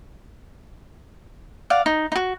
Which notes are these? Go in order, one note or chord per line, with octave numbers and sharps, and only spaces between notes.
D5 F5 F#5
D#4
D#4 F#4